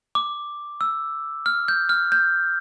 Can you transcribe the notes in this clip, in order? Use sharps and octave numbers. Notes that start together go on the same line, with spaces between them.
D6
E6
F6
G6
F6
G6